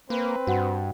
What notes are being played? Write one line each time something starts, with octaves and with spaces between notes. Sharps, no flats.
A#3 C4 B4
G2 F#4 F#5